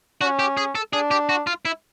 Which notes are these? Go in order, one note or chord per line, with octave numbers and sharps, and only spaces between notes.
C#4 F#4
G4
G#4
A4
D4 G#4
G4
F#4
F4
E4